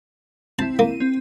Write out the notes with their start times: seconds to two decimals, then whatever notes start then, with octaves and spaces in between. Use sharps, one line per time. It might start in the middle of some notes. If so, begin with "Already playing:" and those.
0.59 C4 E4 A5
0.79 A#3 D#7
1.00 C4